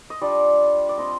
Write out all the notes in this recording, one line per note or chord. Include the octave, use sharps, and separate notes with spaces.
D#5
G3 D4 F4 D5
D5
F3 C4 F4 D#5